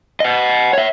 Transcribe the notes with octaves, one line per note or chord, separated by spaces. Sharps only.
D#5 F#5
C#5 E5